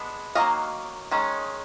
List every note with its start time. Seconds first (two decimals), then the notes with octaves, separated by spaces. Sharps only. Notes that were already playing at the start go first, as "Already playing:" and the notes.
Already playing: G#3 B3 D4
0.35 D#3 F#3 A#3 C#4 D#5 F5
1.11 D#3 G#3 C#4